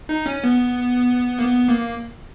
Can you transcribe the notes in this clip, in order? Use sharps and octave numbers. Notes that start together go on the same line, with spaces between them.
D#4
C#4
B3
A#3
B3
A#3